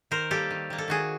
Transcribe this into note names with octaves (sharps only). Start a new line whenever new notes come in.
D#3 A#4 C5
G3 A#3 G4 A4
D#3
G3 A#3
A4
D#3 F#4 G#4